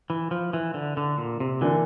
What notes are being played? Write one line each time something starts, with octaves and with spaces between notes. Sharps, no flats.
E3
F3
E3
D3
D3
A#2
C3
D3 E3 A#3 D4